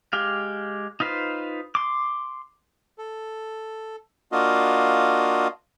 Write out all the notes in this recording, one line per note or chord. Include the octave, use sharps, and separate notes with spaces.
G#3 G4 F5
D#4 F4 B4 C5
C6 D6
A4
A#3 D4 F4 F#4 D#5 F5